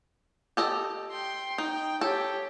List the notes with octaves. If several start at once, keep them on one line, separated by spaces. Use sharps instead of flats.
G4 A4 D#5
G5 C6
D#4 G5
G4 A4 C#5